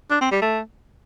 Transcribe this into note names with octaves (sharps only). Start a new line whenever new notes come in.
D4
C4
G3
A3